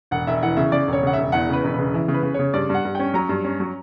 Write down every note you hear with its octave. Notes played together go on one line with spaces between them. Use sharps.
E1 F#5
E1 E5
E3 F#5
C#3 E5
C#3 D5
E1
C#5
C#3 F#5
E1 E5
E2 F#5
C#3 B4
E1
C#3 B4
E3
C#3
B4
C#3
C#3 C#5
G2 D5
G2 F#5
G2
C#4 G5
F#3 A#5
G2
C#4
F#3